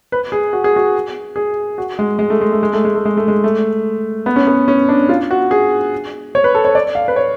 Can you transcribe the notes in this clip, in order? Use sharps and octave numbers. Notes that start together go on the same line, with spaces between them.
B4
G#4
F#4
G#4
F#4
G#4
F#4
G#3
G#3
A3
G#3
A3
G#3
A3
G#3
A3
G#3
A3
G#3
A3
B3
C#4
B3
C#4
D4
F4
F#4
G#4
C#5
B4
A4
C#5
D5
F5
B4
C#5